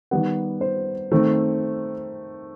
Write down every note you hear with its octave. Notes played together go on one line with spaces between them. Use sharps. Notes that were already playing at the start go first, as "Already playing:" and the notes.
D#3 G3 B3 F#5
C5
D#3 A3 C4